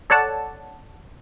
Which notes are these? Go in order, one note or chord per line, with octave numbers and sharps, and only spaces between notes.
A4 C#5 D5 F#5 A5